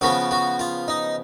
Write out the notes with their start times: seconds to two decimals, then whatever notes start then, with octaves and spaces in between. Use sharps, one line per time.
0.01 C#3 F3 B3 F#4
0.31 F#4
0.59 F4
0.88 D#4